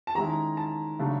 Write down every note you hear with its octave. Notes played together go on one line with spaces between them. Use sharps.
A5
D#3 G#3 C#4 E4 A#5
A5
C#3 F#3 A3 D4